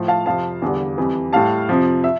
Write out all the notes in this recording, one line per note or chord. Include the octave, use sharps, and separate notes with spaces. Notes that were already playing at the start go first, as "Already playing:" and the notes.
Already playing: A2 F3
F5 A5
F2 C3 F3 F5 A5
E2 D3 G3
F2 E3 G3
A2 G3 F5 A5
F2 C3 F3
E5